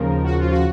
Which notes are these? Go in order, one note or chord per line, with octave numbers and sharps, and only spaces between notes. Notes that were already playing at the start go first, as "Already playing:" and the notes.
Already playing: D#2 C#3 F3 A#4
F#4
F4
F#4